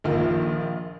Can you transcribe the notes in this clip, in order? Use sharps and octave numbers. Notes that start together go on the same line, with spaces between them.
A#1 D#3 F4